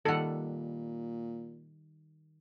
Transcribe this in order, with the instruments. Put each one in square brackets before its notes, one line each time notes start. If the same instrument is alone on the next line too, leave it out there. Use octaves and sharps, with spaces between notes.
[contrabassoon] A#2 [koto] D#3 G3 [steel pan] A4 F#5